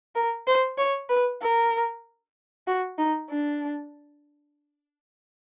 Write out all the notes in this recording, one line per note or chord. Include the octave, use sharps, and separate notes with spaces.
A#4
C5
C#5
B4
A#4
F#4
D#4
D4